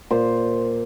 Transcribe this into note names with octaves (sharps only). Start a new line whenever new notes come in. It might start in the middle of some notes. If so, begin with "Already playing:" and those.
A#2 C5